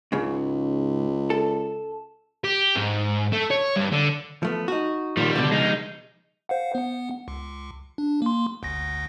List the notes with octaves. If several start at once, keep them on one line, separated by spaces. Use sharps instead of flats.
C#2 G#2 C#3
A4
G4
G#2
A3
C#5
G2
D3
F3 A3 B3
D#4 F#4
D#2 A#2 D#3 F3 G3
C#2 B2 D3
F3 G#3 D#4
C5 F5 F#5
B3 F#5
C#2
D4
A#3 C6
G1 D2 A#6